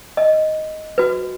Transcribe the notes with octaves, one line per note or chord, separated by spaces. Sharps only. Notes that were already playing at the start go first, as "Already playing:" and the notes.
D#5
F#4 B4